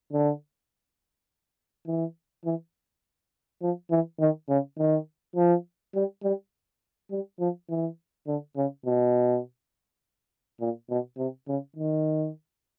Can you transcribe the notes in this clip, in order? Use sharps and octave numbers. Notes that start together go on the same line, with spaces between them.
D3
E3
E3
F3
E3
D#3
C#3
D#3
F3
G3
G3
G3
F3
E3
D3
C#3
B2
A#2
B2
C3
C#3
D#3